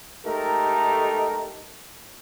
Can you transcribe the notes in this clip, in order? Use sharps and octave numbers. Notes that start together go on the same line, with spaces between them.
G#3 A3 D#4 G4 A4 A#4